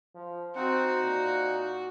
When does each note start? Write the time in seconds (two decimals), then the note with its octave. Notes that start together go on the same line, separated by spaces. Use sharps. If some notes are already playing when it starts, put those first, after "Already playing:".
0.15 F3
0.55 C4 D#4 F#4 F#5
1.04 A#2